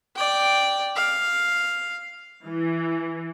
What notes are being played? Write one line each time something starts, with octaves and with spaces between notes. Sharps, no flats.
D5 G5
F5
E3